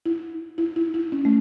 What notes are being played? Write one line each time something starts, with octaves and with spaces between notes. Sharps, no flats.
E4
E4
E4
E4
C#4
A3